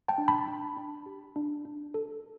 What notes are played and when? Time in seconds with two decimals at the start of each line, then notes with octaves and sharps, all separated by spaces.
0.08 G5 A5
0.18 D4
0.28 A5 B5
0.48 D4
0.77 D4
1.06 G4
1.36 D4
1.65 D4
1.94 A4